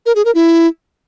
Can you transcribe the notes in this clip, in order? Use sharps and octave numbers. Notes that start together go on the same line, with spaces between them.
A#4
G#4
A#4
E4